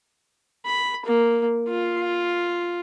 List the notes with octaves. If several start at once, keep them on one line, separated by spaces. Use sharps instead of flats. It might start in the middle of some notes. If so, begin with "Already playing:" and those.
B5
A#3
F4